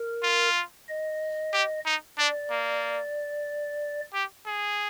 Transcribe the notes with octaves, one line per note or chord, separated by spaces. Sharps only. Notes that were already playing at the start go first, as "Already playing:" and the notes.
Already playing: A#4
F4
D#5
G4
D#4
D4 D5
A#3
G4
G#4